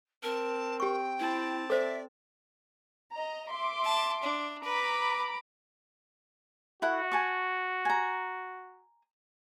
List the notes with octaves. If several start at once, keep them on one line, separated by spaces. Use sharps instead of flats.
C4 A#4 A5
G4 G5 C#6
C4 E4 A5
A4 C5 D5 E5
D#5 A#5
E5 C6 D6
A5
D4
B4 A#5 B5 D6
E4 F#4 A4 F#5
G#5 A5 C#6
G#5 A#5